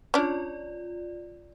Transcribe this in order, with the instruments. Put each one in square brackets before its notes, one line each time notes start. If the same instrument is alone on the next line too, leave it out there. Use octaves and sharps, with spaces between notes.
[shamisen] C#4 D4 [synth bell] F4 D5